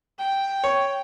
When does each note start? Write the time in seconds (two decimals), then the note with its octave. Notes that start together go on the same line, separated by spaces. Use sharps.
0.19 G5
0.64 C#5